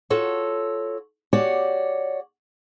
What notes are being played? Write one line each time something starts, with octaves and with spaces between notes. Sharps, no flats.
F4 F#4 A4 C#5
F#4 G4 C#5 D5 F#5